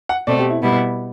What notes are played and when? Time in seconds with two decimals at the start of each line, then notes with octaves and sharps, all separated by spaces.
0.09 F#5
0.27 B2 A3 C4 D5
0.40 G4
0.50 E4
0.62 B2 G3 B3 E4